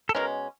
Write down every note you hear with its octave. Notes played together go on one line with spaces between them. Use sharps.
A4
B2 G#3 C#4 A#4